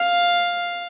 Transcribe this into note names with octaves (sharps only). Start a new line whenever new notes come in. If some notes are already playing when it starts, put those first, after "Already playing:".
Already playing: F5